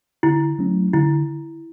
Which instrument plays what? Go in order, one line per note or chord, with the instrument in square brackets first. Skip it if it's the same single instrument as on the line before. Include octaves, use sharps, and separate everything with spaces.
[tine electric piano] D3 [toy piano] E4
[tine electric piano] F#3 A3 C#4
[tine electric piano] D3 [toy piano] E4